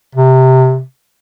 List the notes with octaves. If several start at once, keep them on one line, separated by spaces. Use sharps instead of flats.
C3